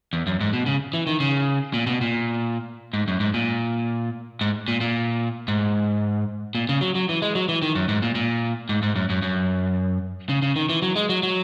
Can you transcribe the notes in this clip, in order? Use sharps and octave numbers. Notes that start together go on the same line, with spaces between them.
E2
F#2
G#2
B2
C#3
E3
D#3
C#3
A#2
B2
A#2
G#2
F#2
G#2
A#2
G#2
A#2
A#2
G#2
A#2
C#3
F#3
F#3
E3
G#3
F#3
E3
D#3
F#2
G#2
A#2
A#2
G#2
G#2
F#2
F#2
F#2
C#3
C#3
D#3
E3
F#3
G#3
F#3
F#3